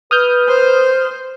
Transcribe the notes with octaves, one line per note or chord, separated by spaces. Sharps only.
B4 D#6 F6 G6
C5